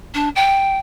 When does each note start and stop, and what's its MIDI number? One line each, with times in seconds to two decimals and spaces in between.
0.14 0.29 62
0.35 0.78 79